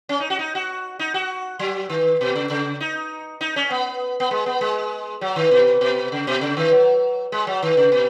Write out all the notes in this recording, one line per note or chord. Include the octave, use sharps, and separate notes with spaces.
C#4
D#4
F#4
D#4
F#4
D#4
F#4
F#3
D#3
B2
C#3
C#3
D#4
D#4
C#4
B3
B3
G#3
B3
G#3
F#3
D#3
B2
B2
C#3
B2
C#3
D#3
F#3
G#3
F#3
D#3
C#3
B2